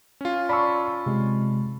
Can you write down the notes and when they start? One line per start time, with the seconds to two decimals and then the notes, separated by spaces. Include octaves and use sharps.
0.21 C#4 F4
0.49 D5 A5 B5 C#6 E6
1.06 C3 G#3